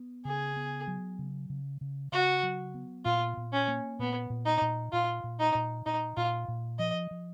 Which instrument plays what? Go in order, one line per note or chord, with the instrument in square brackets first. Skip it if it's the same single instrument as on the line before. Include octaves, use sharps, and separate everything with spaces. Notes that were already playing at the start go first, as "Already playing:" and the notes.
Already playing: [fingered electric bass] B3
[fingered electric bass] C#3 [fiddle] G#4
[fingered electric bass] B3
F#3
C#3
C#3
C#3
[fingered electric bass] C#3 [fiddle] F#4
[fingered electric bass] F#3
B3
[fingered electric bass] A#2 [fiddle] F4
[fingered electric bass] A#2
[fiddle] C#4
[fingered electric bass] A#3
[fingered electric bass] A#2 [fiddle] B3
[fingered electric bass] A#2
[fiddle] D#4
[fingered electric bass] A#2
[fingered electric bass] A#2 [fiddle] F4
[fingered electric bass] A#2
[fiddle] D#4
[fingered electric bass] A#2
[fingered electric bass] A#2 [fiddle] D#4
[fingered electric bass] A#2 [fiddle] F4
[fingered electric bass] A#2
[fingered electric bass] F3 [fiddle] D#5
[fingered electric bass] F3